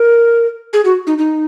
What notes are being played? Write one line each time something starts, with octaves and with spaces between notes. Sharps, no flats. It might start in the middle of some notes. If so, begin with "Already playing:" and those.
Already playing: A#4
G#4
F#4
D#4
D#4